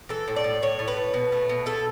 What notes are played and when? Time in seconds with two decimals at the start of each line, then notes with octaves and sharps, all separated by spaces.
0.09 E3 A4
0.28 A2
0.36 D5
0.44 A2
0.63 A2 C#5
0.79 A2
0.88 B4
0.96 A3
1.14 B2
1.32 A3
1.49 B2
1.66 A3 A4